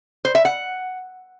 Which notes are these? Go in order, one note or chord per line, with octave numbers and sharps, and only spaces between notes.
C5
E5
F#5